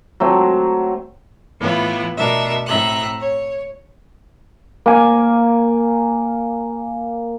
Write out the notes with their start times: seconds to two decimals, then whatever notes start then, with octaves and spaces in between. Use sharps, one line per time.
0.20 F#3 A3 C4
1.59 A2 E3 B3 E4 F4
2.17 B2 A3 D4 A#4 E5
2.65 A2 C4 E5 A#5 F#6
3.18 C#5
4.86 A#3 G#5